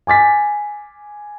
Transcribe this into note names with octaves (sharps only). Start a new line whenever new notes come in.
G#5 D6 A6 B6